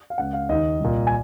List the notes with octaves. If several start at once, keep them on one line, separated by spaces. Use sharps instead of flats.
F5
C#2 C#3 F#5
F5
D#2 D#3 D#5
C2 A#2
G#5